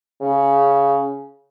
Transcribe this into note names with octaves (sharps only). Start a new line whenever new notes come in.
C#3